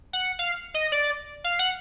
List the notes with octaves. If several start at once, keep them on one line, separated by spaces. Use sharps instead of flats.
F#5
F5
D#5
D5
F5
F#5